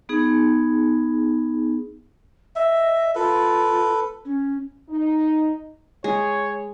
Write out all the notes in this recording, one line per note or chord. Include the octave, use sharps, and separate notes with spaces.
B3 D#4 G#4
D#5 E5
F4 A4 B4
C#4
D#4
G#3 G#4 C#5